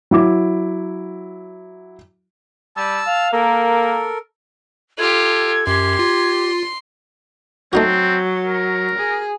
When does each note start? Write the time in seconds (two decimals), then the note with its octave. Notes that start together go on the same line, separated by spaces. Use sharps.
0.11 F#3 E4 D6
2.77 G3 A5 E6
3.06 F5
3.33 A#3 A4 A#4
4.98 F4 G4 A4 G#6
5.67 F#2 G4 C6
5.99 F4
7.73 F#3 A3 C4 D#4 F#4
8.45 A#4
8.98 G#4